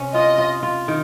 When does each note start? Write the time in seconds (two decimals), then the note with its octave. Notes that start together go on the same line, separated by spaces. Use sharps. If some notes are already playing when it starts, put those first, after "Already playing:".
Already playing: C3 C#4
0.14 F4 D#5
0.38 F4
0.63 F4
0.88 D#3